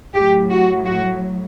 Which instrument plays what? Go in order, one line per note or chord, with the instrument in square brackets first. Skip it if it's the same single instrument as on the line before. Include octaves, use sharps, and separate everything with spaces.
[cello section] A2 F#3 G4
F#4
F#4